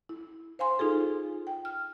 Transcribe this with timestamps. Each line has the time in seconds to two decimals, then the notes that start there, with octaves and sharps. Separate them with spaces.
0.09 E4
0.59 C5 F5 G#5 C6
0.79 D#4 F4 G#4 A4
1.47 G5
1.65 F6